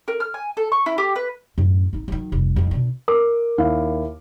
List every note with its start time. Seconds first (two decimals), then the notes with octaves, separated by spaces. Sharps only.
0.08 A#4
0.20 F6
0.34 G#5
0.57 A4
0.72 C#6
0.86 E4
0.98 G4
1.16 B4
1.58 F#2 A2
1.93 G#1 D#4
2.08 D#3 F#3
2.32 F1 C2
2.56 F2 A2
2.71 B2 D4
3.08 A#4 D6
3.58 D#2 E4 F5